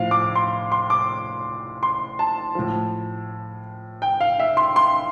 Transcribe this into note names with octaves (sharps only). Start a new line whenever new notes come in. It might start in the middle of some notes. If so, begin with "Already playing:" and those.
Already playing: A2 F3 F5
D6
C6
C6
D6
C6
A5
A2 F3
G5
F5
E5
C6
C6